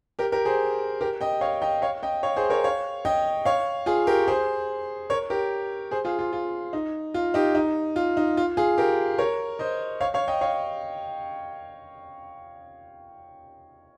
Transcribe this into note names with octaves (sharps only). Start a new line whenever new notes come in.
G4 A#4
G4 A#4
G#4 C5
G4 A#4
D#5 G5
C#5 F5
D#5 G5
C#5 F5
D#5 G5
C#5 F5
G#4 C5
A#4 C#5
C#5 F5
D#5 G5
C#5 F5
F4 G#4
G4 A#4
G#4 C5
A#4 C#5
G4 A#4
G#4 C5
F4 G#4
F4
F4
D#4
F4
D#4 G4
D#4
F4
D#4
F4
F4 G#4
G4 A#4
A#4 C#5
C5 D#5
C#5 F5
C#5 F5
D#5 G5
C#5 F5